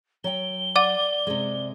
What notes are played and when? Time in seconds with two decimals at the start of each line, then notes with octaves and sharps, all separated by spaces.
0.24 F#3 G5 G7
0.76 D5 F#5 D6
1.27 C3 G#3